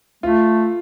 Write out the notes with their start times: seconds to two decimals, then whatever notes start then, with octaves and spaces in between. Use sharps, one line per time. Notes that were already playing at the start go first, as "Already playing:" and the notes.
0.23 A3 F4